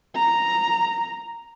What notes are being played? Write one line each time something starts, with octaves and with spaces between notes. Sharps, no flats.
A#5